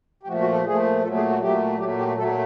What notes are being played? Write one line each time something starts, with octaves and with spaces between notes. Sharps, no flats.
G4
A#2 F3 A3 F#4
F#4
A4
A#2 F3 A3 G#4
A#2 F#3 A3 A4
G#4
F#4
A#2 F#3 A3 G4
A#2 F#3 A3 G4
G4
A#2 F#3 A3 A4